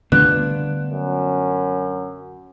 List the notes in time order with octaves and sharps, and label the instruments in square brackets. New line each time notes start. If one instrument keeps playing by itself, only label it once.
[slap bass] D3 G3 A3 [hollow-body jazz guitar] B3 D4 F4 [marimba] F#6
[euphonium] F#2